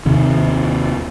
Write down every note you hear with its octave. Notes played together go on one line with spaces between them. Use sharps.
D#2 C3 D#3